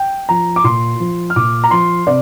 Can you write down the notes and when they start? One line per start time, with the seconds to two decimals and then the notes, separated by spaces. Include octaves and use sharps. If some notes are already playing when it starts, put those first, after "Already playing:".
Already playing: G5
0.29 F3 A#5
0.56 D6
0.64 A#2 C6
1.00 F3
1.30 F6
1.36 A#2 D6
1.64 A#5
1.71 F3 C6
2.07 C3 D5